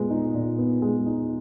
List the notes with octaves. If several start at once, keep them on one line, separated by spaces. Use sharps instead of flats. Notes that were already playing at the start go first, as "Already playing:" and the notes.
Already playing: A#2 G#3 B3
D#4
A#2
B3
G#3
D#4